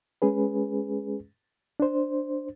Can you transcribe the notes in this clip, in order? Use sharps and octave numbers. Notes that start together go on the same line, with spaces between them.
G#3 C#4 G#4 B4
D4 C5